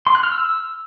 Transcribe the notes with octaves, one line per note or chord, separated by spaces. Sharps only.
C6
F#6
F6
E6